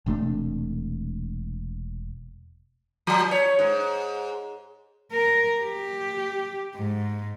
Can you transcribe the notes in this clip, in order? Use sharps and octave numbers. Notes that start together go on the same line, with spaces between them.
E1 C3 A3 D4
F3
C#5
G#2
A#4
G4
G#2